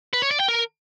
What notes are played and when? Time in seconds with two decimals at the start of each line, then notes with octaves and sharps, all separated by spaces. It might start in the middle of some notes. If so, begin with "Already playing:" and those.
0.13 B4
0.22 C#5
0.31 D5
0.40 G5
0.48 A#4